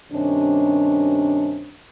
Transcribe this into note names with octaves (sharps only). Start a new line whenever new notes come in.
G2 C3 D#3 C#4 D4